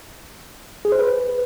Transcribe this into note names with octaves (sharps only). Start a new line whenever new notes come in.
G#4
C5
B4